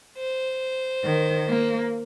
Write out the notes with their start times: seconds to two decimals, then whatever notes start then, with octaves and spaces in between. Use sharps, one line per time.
0.18 C5
1.04 D#3
1.48 A#3